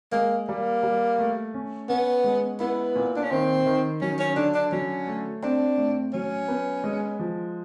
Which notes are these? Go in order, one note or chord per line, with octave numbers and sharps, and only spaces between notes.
G#3 A#3
G3 A#3
G3
A3
C#4
B3 C#4
G#3
B3 E4
A#2
D4
C#4
D#3 C4
D#3
F#3 C#4
C#4
D3 D4
D4
F#3 C#4
A3
C4 D4
A2
F#3 C#4
B3
G#3
F3